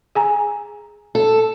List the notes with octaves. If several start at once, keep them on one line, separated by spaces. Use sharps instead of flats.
G#4 G#5 A#5
A4